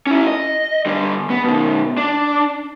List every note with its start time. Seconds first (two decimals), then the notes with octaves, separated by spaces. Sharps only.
0.07 C#4 E4
0.27 D#5
0.86 D3 G3
1.30 B3
1.44 B2 D#3
1.97 D4